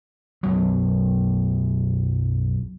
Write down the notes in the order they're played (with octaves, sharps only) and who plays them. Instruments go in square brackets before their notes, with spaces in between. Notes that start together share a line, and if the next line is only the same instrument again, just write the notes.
[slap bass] B1 F#2 F#3